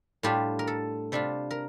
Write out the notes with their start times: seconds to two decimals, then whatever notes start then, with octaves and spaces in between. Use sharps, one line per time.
0.23 A2 G3 D4 F4 G4
0.59 A#4
0.67 A4
1.12 C3 G3 D4 F4
1.51 A#4